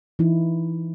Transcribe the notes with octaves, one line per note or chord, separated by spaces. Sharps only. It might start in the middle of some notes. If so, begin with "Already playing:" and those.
E3 D#4 E4